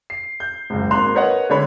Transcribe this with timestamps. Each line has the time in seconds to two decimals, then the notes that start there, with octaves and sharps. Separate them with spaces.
0.10 C7
0.40 G6
0.70 F#1 C#2
0.91 G#1 A#3 A#5 C6 F#6 F7
1.15 A#4 B4 C#5 D#5 F#5
1.50 D3 G#3 C#5 B5